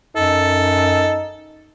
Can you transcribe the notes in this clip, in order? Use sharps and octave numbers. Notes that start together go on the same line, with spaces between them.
F#2 D#4 A4